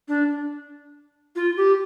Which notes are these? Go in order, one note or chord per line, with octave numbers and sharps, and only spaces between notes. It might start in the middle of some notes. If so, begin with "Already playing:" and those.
D4
F4
G4